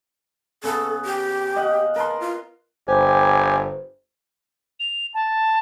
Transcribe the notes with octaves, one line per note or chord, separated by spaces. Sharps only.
C#3 B3 A4
G4
D#5 F5 F#5
A#4 B4 A5 C6
F4
G1 G4 C5 G#5
F7
A5